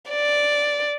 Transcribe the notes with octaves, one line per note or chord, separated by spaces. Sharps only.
D5